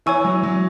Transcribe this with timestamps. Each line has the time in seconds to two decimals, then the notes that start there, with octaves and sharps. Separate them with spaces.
0.06 E3 C#5 G#5 C#6 E6
0.25 F#3
0.43 F#3